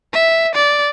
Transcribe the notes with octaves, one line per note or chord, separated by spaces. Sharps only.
E5
D5